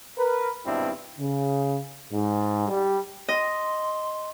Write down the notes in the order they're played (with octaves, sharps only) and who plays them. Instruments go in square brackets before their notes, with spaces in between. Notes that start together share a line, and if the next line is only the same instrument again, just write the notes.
[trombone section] A#4 B4
G#1 G2 B2 C4 D4 E4
C#3
G#2
G3
[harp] D#5 [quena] C6